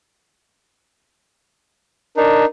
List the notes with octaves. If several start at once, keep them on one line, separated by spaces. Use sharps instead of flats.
D4 D#4 A#4